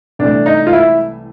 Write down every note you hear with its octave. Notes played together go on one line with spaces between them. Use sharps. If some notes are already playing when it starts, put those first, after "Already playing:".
C2 C3 E3 A3 D4
D#4
F4
E4